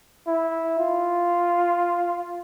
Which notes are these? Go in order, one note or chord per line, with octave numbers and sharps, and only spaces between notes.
E4
F4